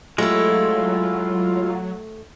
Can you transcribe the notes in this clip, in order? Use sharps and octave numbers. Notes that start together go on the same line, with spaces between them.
F#3 G#3 A3 E4 F4 G4